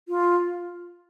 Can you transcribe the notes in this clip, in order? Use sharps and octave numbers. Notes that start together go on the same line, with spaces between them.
F4